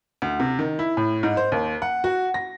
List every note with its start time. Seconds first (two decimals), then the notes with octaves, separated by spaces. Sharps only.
0.22 D2
0.40 C3
0.59 D#3
0.79 E4
0.97 A2
1.23 G#2
1.37 C5
1.52 D#2
1.82 F#5
2.04 F#4
2.34 A#6